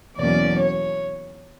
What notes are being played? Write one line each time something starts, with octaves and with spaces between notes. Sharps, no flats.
E2 B2 F#3 A#3 C#4 D5
C#5